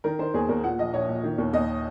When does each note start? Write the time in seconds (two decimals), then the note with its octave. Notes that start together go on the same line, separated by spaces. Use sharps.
0.04 D#3 A#4
0.19 D#3 C5
0.34 D#2 G#4
0.49 D#2 A#4
0.64 A#2 F#5
0.78 A#1 D#5
0.94 A#1 C#5
1.08 A#1
1.24 D#3
1.38 D#2
1.53 D#2 D#5